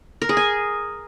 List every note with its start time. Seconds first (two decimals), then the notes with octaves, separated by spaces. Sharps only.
0.22 A#4
0.29 G#4
0.37 G#5